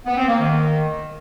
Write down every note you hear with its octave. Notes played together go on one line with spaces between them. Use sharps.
B3
C4
A#3
D#3